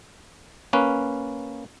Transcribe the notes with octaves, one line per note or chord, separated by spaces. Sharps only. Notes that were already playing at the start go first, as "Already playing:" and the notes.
A#3 C#4 B4